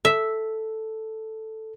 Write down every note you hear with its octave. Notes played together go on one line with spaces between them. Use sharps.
A4 E5